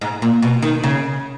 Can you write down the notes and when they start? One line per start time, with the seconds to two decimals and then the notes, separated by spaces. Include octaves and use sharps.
0.01 G#2
0.22 A#2
0.42 B2
0.62 D#3
0.84 C#3